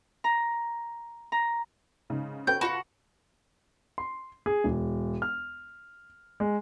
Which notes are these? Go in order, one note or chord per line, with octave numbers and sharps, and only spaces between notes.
A#5
A#5
G#2 C#3 D#4
C#4 F#4 A4 B4 G5 G6
F4 F#4 F#5 A5 B5 C6
C6
G#4
E1
F6
G#3